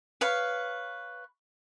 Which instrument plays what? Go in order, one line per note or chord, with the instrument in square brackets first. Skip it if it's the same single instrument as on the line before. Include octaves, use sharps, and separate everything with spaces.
[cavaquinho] B4 C#5 F5